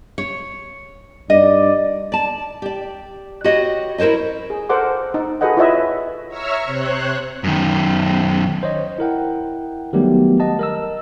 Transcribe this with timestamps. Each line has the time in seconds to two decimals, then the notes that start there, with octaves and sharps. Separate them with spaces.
0.18 C#5
1.30 G2 D#4 D5 D#5
2.12 D5 A5
2.62 G4 D5
3.44 F#4 G4 B4 C#5 D#5
3.98 E4 A#4 C5 C#5 D#5
4.50 G#4
4.69 A4 A#4 C5 F#5 D6
5.14 D#4
5.41 F#4 G#4 A4 B4 D#5 F#5
5.57 E4 F4 B4 C#5 D#5 E5
6.28 C#5 E5 A#5 C#6 E6 F6
6.66 C3 C5 C#5 F#6
7.44 F#2 D#3
8.63 C5 C#5 D#5
8.98 E4 A#4 F#5 G5
9.93 D#3 F#3 G3 A3 B3 G4
10.40 D#5 F#5 A5
10.59 A#4 D#5 E6